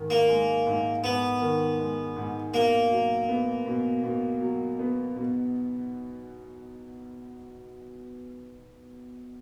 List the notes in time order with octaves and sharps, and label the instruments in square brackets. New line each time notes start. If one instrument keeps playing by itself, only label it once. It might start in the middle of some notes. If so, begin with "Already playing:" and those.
Already playing: [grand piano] G#2 D#3
[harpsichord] A#3
[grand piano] G#3
G#2
[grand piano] G#2 [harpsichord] B3
[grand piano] D#3
G#3
G#2
[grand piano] B2 [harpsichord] A#3
[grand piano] F#3
B3
B2
B2
F#3
B3
B2